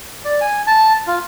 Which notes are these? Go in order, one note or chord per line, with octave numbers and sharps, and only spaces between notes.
D5
G#5
A5
F4